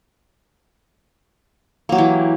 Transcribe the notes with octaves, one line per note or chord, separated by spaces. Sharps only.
E3 F#3 A#3 G4